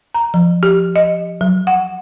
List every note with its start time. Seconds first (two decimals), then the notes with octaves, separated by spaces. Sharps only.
0.15 A#5
0.34 F3
0.63 G4
0.96 D#5
1.41 F#3
1.67 F#5